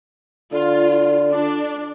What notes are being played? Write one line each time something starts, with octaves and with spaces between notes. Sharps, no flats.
D3 F4
D4